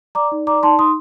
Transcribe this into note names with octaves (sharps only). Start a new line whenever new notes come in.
D5 A#5 D6
D#4
D5 A#5 D6
D#4 A5 C6
D#4 C6 D#6